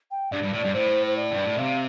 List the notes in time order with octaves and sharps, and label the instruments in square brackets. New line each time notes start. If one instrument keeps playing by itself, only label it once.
[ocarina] G5
[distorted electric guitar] G2 [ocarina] D5
[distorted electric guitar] G2
A2
G2
[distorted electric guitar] A2 [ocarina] C5
[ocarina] C5
D5
[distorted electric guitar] G2
A2
[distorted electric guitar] C3 [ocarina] F5